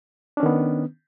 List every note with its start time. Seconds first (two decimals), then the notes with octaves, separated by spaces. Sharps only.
0.37 D4
0.40 C#4
0.43 D#3
0.46 B3